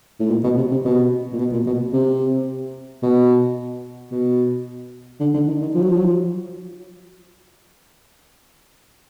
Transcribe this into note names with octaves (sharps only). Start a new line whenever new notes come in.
A2
A#2
B2
C3
C3
B2
A#2
B2
A#2
B2
C3
B2
B2
D3
D3
D#3
D#3
F3
F#3
F3
F#3
F3